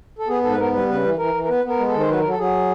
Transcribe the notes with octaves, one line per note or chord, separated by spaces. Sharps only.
A4
B3 G#4
G#2 A4
B4
B3 A#4
G3 B4
C#3 B4
E3
E3 A#4
E3
A#4
B3 B4
B3 A#4
G#3
A4
D#3
C5
F#3 B4
A#4
F#3
A4
F#3 G#4